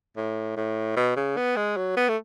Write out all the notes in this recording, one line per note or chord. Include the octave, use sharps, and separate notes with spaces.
A2
A2
B2
C#3
B3
G#3
F#3
B3
A3